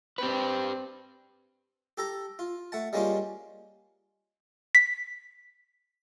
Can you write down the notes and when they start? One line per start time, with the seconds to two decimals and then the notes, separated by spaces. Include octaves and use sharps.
0.18 C4 G4 B4
1.98 G4 A4 A#5
2.39 F4
2.72 A3 F#5 A5
2.93 G3 G#3 A#3 C#4 F4 G4
4.75 B6